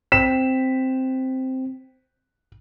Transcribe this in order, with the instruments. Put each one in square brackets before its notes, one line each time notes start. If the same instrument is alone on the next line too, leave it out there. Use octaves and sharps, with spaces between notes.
[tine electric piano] C4 [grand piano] B6 E7